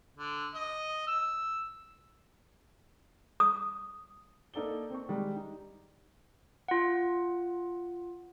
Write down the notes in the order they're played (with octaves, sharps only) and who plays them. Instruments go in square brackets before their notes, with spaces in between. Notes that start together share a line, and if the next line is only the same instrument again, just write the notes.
[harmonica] D3
D#5
E6
[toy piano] D#6
[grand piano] A#3 D#4 A4 D5 G7
C4 C#6
D#3 G3 G#3
D#4
[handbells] F4 F#5